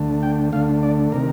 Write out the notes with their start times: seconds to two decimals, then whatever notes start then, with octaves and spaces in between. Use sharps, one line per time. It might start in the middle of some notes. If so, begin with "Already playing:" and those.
Already playing: D2 D3 A3
0.23 G5
0.52 D2 D3 A3 F5
0.83 D5
1.12 C3 D#3 A#4